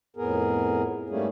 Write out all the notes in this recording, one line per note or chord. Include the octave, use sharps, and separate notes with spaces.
F2 A2 B3 G#4 A#4
G#2 G3 A3 A#3 C#4 G#4